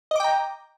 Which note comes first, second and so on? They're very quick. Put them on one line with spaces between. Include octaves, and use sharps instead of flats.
D#5 D6 G5 A#5